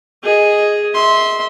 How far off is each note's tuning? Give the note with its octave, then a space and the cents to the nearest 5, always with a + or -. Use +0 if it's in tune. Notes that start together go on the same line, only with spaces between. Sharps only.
G#4 +0 D#5 +0
E5 -25 C6 +0